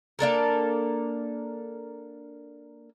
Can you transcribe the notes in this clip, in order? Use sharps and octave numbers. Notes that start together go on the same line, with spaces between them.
A#3 D4 A4 A#4